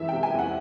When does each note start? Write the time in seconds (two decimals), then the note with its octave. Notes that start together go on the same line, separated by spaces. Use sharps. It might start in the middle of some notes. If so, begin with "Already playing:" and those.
Already playing: F#2 E3 E5
0.09 C3 G5
0.23 G#5
0.34 E2 F#5